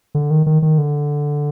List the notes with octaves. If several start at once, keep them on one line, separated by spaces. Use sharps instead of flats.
D3
D#3
D#3
D#3
D3